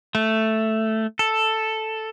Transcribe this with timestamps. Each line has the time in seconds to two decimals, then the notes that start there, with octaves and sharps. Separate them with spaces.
0.15 A3
1.19 A4